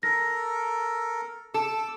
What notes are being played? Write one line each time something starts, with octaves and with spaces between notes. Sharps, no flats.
A4 A#4 A#6
A4 D6 E6